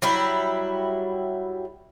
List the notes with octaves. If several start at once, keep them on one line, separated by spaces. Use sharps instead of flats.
F#3 G3 E4